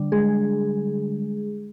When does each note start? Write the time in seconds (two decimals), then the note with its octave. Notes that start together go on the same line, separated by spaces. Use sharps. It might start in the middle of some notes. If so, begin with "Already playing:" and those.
Already playing: D3 G3 D4
0.12 G#3 G#4